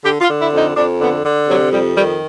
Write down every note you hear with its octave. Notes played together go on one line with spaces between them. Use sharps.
D3 G4
F4
D3
E4
F2
D#4
F2 D4
D3 B3
D3
C3 F#3
F2 G3
D#3 G3